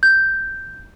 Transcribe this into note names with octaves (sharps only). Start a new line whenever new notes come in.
G6